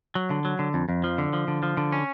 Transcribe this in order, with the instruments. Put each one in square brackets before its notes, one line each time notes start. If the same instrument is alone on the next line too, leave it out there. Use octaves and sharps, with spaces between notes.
[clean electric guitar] F#3
D3
F#3
D3
F2
F2
F3
D3
F3
D3
F3
D3
C#4